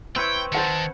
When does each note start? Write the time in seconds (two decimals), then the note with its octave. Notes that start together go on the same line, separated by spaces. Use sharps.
0.16 C4 E4 B4 C#5 G5
0.52 D#3 C5 F#5 A5 C#7